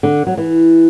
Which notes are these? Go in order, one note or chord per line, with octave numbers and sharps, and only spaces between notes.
D3
F#3
E3